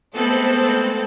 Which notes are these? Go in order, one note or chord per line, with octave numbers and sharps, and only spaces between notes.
G#3 A3 B3 C4 A4